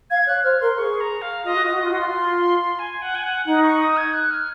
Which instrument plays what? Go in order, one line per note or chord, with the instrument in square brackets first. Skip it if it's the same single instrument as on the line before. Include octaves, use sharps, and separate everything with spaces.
[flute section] F5 [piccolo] G#6
[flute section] C#5 [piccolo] F#6
[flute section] C5 [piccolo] F6
[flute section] A#4 [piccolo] C6
[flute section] G#4 [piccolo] C#6
[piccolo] A#5
F5
[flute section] F4 [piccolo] D#5
[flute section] F#4
[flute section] F4 [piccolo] D#5
[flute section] F#4
F4
[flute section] F#4 [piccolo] C6
[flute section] F4
F4
[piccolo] G#5
F#5
G#5
F#5
[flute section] D#4 [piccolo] F#5
[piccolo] C#6
D#6
G#6
F#6
F6